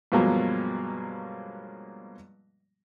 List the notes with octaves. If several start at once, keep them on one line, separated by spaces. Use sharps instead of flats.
G2 B2 F3 F#3 G#3 A#3